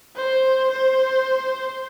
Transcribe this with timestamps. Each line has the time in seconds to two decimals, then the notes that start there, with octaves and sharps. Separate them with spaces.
0.16 C5
0.71 C5